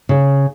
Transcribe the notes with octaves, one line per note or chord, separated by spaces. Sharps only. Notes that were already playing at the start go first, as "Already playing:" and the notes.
C#3